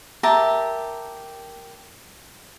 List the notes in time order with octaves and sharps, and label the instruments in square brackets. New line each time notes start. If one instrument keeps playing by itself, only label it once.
[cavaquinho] G4 A#4 E5 A5